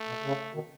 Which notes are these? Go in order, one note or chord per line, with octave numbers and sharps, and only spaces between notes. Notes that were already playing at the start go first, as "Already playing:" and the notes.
Already playing: A3
B2
C#3
B2 D#3